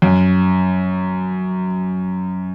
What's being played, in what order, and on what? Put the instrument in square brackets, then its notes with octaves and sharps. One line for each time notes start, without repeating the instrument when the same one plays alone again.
[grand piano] F#2